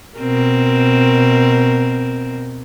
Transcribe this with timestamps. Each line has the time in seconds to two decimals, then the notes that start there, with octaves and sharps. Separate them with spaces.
0.18 B2 C4 A#4